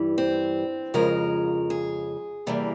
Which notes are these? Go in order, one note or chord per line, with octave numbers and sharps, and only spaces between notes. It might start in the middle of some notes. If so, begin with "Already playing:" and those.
Already playing: G2 E3 G3
C4
F2 C#3 F3 G#3 A#4
G#4
E2 C3 E3 G3 A#3